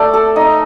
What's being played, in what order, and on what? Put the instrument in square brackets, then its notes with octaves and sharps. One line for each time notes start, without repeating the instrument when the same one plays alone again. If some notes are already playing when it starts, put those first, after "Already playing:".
Already playing: [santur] A3 [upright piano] D5
[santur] A4
[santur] D#4 [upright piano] D#5